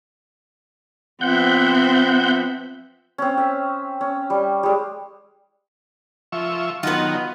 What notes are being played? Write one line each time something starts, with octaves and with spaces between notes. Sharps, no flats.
F3 B3 C4 E5 F#5 G6
C4 C#4
E5
C#4
G3
G3 G#3
F3 E5 C#6
D#3 F#3 B3 F4